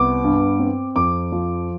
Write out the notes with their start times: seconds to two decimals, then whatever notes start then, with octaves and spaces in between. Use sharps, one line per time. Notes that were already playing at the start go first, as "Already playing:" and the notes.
Already playing: C2 B3 D6
0.24 G2
0.59 C4
0.96 F2 D6
1.32 F3